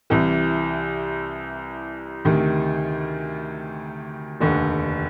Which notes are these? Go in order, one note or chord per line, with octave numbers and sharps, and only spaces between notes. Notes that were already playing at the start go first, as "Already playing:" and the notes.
C2 C3 E3
D2 C3 D#3
F1 D#2 D3